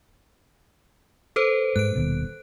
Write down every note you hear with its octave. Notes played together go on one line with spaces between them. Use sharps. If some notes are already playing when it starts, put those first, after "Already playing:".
A4 B4 C5
G#2 F#6 D7
D#1 D#2 B2